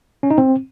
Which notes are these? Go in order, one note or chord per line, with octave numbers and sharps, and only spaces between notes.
C#4
D#4
C4